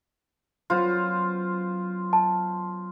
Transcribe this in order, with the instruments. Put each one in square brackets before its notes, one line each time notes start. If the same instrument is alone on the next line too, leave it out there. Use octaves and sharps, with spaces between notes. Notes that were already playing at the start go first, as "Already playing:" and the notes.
[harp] F#3 B3 C#4 [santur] F4 C5
[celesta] A5